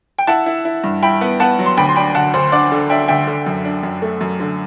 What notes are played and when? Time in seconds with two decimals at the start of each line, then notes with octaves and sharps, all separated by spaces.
0.18 G5
0.27 E4 F#5 A5
0.46 E4
0.65 E4
0.84 G2
1.03 E4 G5 B5
1.21 B3
1.40 B3 F#5 A5
1.59 F#3
1.66 C6
1.77 D2 G5 B5
1.89 C6
1.96 D4 G5 B5
2.15 D2 F#5 A5
2.34 D2 C5
2.52 D4 D5 F#5
2.72 D3
2.90 D4 E5 G5
3.08 D2 E5 G5
3.27 D3
3.46 F#2
3.65 D4
3.83 F#2
4.02 A3
4.21 F#2
4.40 D3